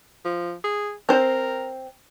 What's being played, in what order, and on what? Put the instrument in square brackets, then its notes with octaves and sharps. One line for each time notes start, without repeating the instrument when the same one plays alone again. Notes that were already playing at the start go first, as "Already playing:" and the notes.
[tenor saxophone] F3
G#4
[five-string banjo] C4 C5 [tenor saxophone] A#4